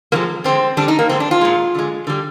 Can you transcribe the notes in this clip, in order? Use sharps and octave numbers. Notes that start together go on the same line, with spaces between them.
C3 F3 G#3 A#3
D3 G#3 C4
D3 G3 D4
D#4
A#3
D3 G#3 C4
D4
F4
A#2 G#3
D3 G#3
D3 G3